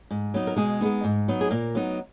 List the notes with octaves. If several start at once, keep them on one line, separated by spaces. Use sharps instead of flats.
G#2
F#3 B3 D#4
A#4
B2 G#3 G#4
G#3 B3 D#4
G#2
F#3 B3 D#4
G#4
A#2 A#3 A#4
F#3 B3 D#4